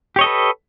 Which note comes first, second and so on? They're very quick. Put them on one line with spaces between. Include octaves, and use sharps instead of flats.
G4 C#5 D#5 A4 B4